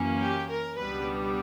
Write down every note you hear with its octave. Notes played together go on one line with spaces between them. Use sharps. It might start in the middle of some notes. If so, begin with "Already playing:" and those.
Already playing: F#2 E3 A#3 C#4
G4
A#4
C#2 B2 G3 B3 D4 B4